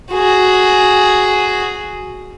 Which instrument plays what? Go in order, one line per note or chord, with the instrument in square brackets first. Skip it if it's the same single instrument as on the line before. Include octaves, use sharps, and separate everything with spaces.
[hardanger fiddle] F#4 G#4